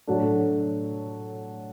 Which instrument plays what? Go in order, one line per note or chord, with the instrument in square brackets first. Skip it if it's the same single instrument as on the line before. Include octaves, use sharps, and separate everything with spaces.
[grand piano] A2 F#3 A3 D4